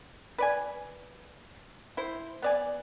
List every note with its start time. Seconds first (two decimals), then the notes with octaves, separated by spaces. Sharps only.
0.38 B4 D5 G#5
1.97 E4 C5
2.42 B3 D5 G#5